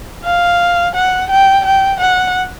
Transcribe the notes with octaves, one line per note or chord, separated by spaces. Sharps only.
F5
F#5
G5
G5
F#5